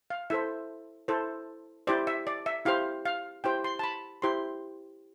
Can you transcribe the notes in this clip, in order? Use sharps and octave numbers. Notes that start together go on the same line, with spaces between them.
F5
E4 A4 C5 E5
E4 A4 C5
E4 G4 C5 D5
E5
D5
E5
E4 G4 C5 F5
F5
E4 G4 C5 G5
C6
A5
B5
E4 G4 C5 C6